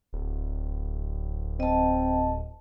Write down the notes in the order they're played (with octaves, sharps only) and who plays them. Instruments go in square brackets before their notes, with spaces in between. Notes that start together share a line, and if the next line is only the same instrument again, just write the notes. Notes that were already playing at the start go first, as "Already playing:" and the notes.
[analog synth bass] D1
[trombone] C4 [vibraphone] D#5 A5